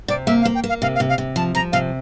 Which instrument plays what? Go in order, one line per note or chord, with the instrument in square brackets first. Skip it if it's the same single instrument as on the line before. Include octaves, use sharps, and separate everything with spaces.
[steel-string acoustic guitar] C3 [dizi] D5
[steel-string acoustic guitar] A#3 [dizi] E5
[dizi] F5
[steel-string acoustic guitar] A#3
[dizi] G5
[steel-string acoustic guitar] A#3
[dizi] F5
[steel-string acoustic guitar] C3 [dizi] F5
[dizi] F5
[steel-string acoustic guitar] C3
[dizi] F5
[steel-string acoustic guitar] C3
[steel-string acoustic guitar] F3 [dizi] A5
[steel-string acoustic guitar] F3 [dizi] A#5
[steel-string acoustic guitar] C3 [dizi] F5